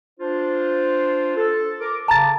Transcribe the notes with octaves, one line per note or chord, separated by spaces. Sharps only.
D4 F4 C5
A4
A#4 D6
C#3 A5 A#5 A6